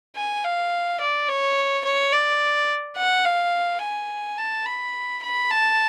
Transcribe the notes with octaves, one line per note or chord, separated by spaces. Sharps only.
G#5
F5
D5
C#5
C#5
D5
F#5
F5
G#5
A5
B5
B5
A5